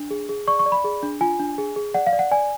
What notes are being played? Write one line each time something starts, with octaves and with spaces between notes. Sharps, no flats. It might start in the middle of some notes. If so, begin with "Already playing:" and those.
Already playing: D4
G#4
G#4
D5 C#6
C#6
D5
B5
G#4
D4
F4 G#5
D4
G#4
G#4
D5 F#5
F5
D5
F#5
D5 G#5